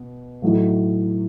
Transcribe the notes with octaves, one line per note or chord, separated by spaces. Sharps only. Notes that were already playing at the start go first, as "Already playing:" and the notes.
Already playing: B2
A2 F#3 A3 D#4